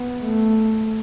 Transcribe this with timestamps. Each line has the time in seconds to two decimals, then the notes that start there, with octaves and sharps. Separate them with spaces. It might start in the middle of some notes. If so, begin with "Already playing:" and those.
Already playing: B3
0.22 A3